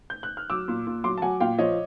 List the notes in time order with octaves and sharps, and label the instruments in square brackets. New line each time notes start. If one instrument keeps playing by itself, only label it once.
[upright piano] G6
F#6
F6
F#3 D6 E6
A#2
A#2
F#3 C6 D6
A5
F#3 F#5 G#5
A#2 F5 G5
F3 C#5 D#5